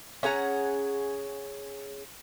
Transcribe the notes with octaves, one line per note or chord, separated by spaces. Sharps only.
C#4 G#4 F#5 A#5